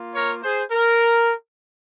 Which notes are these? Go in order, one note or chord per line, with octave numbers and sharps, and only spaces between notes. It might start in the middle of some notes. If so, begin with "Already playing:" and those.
Already playing: A#3 F4
A#4 C#5
G#4 C5
A#4